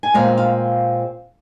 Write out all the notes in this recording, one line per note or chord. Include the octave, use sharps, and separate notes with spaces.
G#5
A#2 G#3 C4 F5
F5